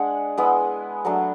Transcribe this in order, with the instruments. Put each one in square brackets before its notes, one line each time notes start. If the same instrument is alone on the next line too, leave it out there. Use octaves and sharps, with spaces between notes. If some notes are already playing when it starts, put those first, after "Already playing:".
Already playing: [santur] G#3 D4 F#5
G#3 B3 E4
F#3 A3 D4